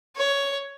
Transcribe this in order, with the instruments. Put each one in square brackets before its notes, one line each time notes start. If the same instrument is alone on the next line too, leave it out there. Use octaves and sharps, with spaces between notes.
[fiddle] C#5